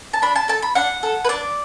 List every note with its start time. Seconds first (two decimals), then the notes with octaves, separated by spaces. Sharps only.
0.13 A5
0.22 D4 B5
0.35 A5
0.48 A4 A5
0.62 B5
0.75 D4 F#5
1.03 A4
1.25 B4
1.29 D4 D5